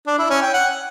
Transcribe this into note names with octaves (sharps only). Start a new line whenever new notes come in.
D4
E4
C#4
G5
F#5